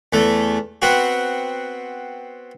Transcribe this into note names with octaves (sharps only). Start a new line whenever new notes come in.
E2 A3
B3 C4 F#4